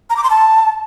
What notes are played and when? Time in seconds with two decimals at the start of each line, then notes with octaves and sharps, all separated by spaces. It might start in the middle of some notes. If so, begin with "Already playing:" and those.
0.10 A#5
0.17 D6
0.24 C6
0.30 A5